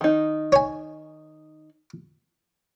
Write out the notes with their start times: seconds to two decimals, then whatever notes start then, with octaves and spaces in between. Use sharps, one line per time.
0.01 D#3 D#4
0.52 C#5 G#5